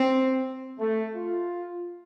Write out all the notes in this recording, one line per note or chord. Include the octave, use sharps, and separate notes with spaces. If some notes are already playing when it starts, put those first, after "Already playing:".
Already playing: C4
A3
F4